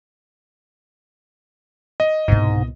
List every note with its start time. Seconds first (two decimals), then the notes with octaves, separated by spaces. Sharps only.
2.00 D#5
2.28 C2 G#2 B2